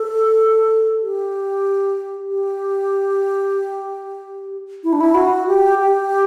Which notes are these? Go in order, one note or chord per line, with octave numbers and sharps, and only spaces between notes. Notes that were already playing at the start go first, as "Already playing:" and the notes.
Already playing: A4
G4
G4
E4
D4
E4
F#4
G4
G4